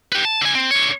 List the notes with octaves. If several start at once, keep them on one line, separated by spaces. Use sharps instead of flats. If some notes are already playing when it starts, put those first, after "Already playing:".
G4 B4
A5
D3 G#5
C4
D3 C#5